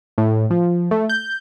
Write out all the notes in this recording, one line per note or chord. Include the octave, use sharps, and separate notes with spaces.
A2
F3
A3
G6